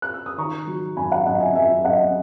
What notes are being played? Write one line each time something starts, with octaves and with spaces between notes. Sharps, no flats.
F#6
E6
D#6
D#3 A#5 C#6
F#3
F#2 G#5 B5
F#5 A#5
F#2 D#5 F#5
E5 G#5
F#2 E5 G#5
F#2 D#5 F#5